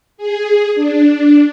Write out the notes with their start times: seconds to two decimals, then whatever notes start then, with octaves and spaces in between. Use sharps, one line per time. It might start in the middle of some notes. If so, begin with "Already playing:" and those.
0.17 G#4
0.75 D4